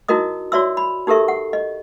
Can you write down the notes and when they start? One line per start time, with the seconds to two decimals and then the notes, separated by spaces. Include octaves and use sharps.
0.08 D#4 E4 F#4 A#4 D#5 D#6
0.52 F#4 C#5 D5 E5 C6 E6
0.77 B5
1.07 D#4 G4 A4 A#4 E5 C#6
1.28 F#5
1.53 D#5